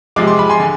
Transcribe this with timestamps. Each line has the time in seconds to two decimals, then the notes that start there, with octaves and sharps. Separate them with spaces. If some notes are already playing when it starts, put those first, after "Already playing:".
0.16 C3 F3 G#3 D6
0.27 C6
0.39 B5
0.50 G#5 C6
0.60 D3